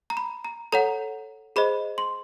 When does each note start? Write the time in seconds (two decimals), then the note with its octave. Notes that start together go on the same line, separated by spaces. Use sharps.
0.10 A#5
0.17 B5
0.45 A#5
0.72 A4 C#5 F#5 A#5
1.56 G#4 C5 D#5 B5
1.98 C6